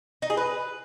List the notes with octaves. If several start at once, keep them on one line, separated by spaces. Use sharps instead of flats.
D#4
G#4
B4